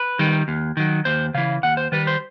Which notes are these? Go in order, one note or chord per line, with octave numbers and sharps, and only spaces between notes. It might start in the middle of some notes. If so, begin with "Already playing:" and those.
Already playing: B4
D#3 G3
D#2
D#3 F#3
D#2 C5
C#3 E3 F5
D#2 F#5
C5
D#3 G3 B4
C5